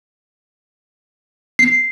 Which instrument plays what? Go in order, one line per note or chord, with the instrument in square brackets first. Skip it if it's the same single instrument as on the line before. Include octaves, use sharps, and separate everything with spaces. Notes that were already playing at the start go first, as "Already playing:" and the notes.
[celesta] C7